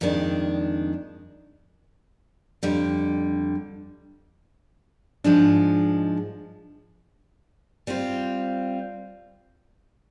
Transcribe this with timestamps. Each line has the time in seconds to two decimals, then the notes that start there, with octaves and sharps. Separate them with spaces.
0.01 F2 D#3 G#3 D4
2.63 F2 D3 G3
5.24 G#2 F3 G#3 D4
7.87 G3 C4 F4